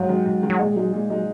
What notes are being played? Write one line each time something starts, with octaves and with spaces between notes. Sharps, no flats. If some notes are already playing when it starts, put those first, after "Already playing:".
Already playing: G#2 F#3
D#3 G#3
G#2
D#3 G#3
F#3
A#2 G#3
F#3 G#3 D#4
A#2 G#3
F#3 G#3 D#4